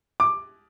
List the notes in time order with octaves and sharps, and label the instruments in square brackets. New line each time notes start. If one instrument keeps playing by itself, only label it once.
[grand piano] D6